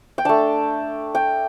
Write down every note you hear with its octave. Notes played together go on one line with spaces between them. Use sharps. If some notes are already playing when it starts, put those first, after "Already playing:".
G5
A3 D4 A5
G5